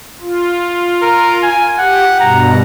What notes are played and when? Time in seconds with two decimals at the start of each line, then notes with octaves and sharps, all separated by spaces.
0.21 F4
1.02 A#4
1.43 G#5
1.79 G4 F#5
2.20 G2 B2 A#5